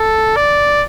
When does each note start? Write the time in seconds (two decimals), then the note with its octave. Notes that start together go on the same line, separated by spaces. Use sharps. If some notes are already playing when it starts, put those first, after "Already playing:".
Already playing: A4
0.36 D5